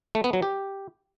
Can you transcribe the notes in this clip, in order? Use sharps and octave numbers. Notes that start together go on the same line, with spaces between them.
A3
B3
F#3
G4